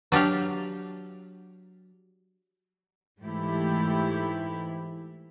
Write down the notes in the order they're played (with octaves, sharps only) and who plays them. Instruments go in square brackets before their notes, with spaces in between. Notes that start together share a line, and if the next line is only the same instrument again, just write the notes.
[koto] F#3 D4 G4 F5
[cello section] G#2 E3 A3 E4 G4